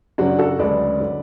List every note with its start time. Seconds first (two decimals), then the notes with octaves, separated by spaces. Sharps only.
0.18 F#2 C#3 F#3 D4 F#4
0.39 F#4 A4
0.59 D2 C#3 G#3 B4 D5
1.00 D3 F#3